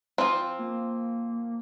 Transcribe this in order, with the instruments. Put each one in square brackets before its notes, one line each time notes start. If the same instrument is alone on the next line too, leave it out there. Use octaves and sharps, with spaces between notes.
[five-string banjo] F3 C4 [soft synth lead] G#5
[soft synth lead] F4
A#3